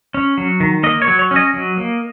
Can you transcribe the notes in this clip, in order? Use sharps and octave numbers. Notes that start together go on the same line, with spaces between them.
C#4
F#3
D#3
A#3 D#5
C#5
F#3
C#5
C#4
D#5
F#3
A#3